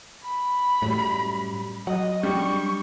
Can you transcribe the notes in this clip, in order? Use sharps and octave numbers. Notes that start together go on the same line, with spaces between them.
B5
F#2 A2 F#3 G3
F#3 D#5 F#5
G3 D4 C#6